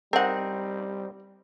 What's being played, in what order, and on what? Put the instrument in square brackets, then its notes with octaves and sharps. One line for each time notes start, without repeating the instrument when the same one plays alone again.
[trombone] G3 [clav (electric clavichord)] C4 D#4 [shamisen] A#4 F#5